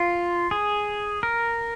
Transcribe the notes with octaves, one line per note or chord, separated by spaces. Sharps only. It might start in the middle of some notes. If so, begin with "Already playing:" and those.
Already playing: F4
G#4
A#4